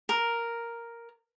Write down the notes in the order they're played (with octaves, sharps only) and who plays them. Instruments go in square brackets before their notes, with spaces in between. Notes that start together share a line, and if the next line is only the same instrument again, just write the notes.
[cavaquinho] A#4